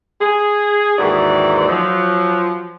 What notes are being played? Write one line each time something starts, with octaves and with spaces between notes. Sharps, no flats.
G#4
D#2 G#2 D#3 E3 F#4 D5
F3 F#3